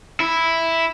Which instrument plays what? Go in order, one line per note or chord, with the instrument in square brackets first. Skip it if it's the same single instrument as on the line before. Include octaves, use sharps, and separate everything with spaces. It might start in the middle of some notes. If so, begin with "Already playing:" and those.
[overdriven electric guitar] E4